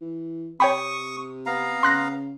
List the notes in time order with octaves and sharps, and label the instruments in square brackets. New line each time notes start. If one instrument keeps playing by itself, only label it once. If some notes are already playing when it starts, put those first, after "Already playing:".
[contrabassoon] E3
[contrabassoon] C3 [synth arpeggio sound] C#5 G5 B5 [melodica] C#6 D#6
[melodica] B3 F5 A#5
[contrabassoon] C#3 [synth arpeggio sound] C6 F#6 A#6